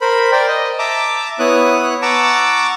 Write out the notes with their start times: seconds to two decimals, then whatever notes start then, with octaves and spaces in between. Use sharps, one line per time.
0.01 A#4 C5 B5
0.32 A#4 C5 D5 G5
0.48 D#5
0.79 E5 A5 A#5 D6
1.39 B3 E4 C#5 D#6 F#6
2.02 F#5 A5 A#5 C#6 D6 E6